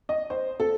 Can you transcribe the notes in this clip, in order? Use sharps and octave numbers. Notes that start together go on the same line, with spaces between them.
D#5
C5
A4